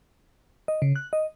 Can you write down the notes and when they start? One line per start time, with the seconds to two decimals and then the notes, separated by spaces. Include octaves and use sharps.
0.68 D#5
0.82 C#3
0.96 F#6
1.13 D#5